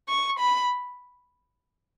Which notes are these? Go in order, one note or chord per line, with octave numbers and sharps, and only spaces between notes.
C#6
B5